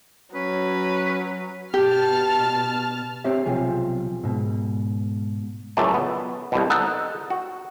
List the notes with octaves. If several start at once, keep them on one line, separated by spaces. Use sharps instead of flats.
F#3 C#4 B4
B2 G4 A5 F6
C4 G4 C#5 E5
B1 C3 F3 G#4
G#2 B2
C#2 F#2 A2 A3 D5
B3
C2 B2
D#4 A4 F#5
F#4